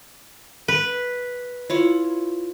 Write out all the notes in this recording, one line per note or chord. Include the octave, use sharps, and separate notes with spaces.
B4
E4 F4 C#5